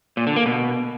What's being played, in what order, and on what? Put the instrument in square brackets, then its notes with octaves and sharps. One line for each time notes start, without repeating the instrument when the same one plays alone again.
[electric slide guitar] A#2
D3
A#3
B2